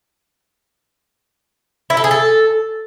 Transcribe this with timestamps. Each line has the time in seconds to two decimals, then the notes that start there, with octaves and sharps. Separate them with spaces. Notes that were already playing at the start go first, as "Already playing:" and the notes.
1.90 E4
1.97 A4
2.04 G#4
2.11 A4